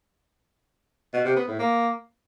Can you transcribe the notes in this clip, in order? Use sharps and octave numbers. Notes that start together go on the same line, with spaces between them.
B2
C3
B3
A2
A#3